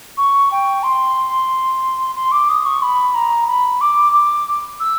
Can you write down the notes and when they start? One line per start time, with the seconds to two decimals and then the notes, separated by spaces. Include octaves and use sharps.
0.17 C#6
0.52 G5
0.83 C6
2.15 C6
2.32 D6
2.49 D#6
2.65 C#6
2.82 B5
3.15 A#5
3.47 B5
3.81 D6
4.13 D6
4.80 E6